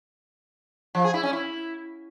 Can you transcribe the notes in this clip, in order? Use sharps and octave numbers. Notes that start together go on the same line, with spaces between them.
F3
G#4
E4
C#4
E4